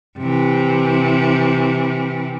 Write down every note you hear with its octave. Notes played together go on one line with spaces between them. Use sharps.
C3 E3